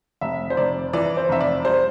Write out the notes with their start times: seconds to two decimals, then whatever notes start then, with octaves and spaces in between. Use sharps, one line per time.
0.21 F1 E5
0.50 C5
0.57 F1 D5
0.93 E3 D5
1.17 C5
1.29 F1 E5
1.41 D5
1.65 G3 C5